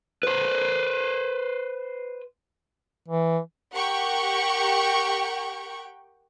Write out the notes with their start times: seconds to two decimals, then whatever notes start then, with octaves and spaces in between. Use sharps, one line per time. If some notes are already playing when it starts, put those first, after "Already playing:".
0.23 B4 C5
3.08 E3
3.73 G4 A#4 F#5 G5 C#6